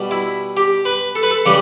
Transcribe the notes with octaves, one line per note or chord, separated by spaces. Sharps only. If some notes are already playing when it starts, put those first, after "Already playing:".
Already playing: B2 G3
E4
G4
B4
A4
B4
A4
C#3 E3 G3 G4